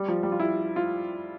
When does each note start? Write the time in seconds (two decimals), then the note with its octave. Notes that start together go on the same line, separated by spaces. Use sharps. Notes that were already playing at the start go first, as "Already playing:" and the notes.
Already playing: G3
0.08 F3
0.23 G3
0.32 F4
0.40 E4
0.76 F4